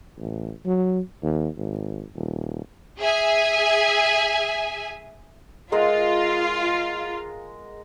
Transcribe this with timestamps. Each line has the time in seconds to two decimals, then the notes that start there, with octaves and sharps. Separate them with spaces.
0.18 A1
0.65 F#3
1.23 D#2
1.57 G#1
2.16 D#1
2.98 G#4 E5 G#5
5.72 G#3 F4 A#4 F#5